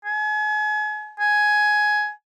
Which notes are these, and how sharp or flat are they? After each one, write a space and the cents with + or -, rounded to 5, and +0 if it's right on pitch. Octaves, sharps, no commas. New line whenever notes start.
G#5 +35
G#5 +10